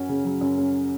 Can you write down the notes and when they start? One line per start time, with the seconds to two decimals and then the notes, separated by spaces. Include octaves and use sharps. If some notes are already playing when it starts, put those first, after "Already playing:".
Already playing: F#2 C#4 F#4
0.09 C#3
0.25 F#3
0.41 F#2
0.58 C#4